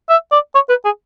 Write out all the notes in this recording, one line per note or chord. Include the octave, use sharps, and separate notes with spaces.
E5
D5
C#5
B4
G#4